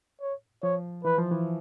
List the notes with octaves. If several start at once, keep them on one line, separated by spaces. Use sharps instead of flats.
C#5
F3 C#5
E3 B4
F3
E3